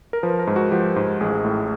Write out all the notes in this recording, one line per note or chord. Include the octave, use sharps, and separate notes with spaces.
A#4
F3 B4
A#4
G#2
F#4
F3 G4
G#2
A1 G#4
A2